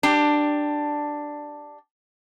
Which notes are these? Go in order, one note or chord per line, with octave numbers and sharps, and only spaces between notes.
D4 G4